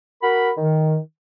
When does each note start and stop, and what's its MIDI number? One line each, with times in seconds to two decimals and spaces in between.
0.21 0.50 66
0.21 0.50 70
0.21 0.50 83
0.57 0.97 51